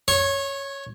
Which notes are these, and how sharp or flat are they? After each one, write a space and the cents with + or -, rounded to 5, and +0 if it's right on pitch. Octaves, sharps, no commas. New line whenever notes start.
C#5 +0 C#6 -30